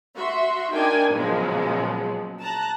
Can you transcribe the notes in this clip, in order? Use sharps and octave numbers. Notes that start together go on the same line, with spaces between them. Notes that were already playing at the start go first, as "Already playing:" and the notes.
F#4 E5 C6
D4 D#4 A#4 G5 G#5
A#2 C#3 F3 F#3 G#3 B3
A5 A#5 F#6